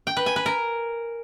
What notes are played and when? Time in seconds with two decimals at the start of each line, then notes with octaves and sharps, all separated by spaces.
0.07 G5
0.17 B4
0.26 G#5
0.36 B4
0.46 A#4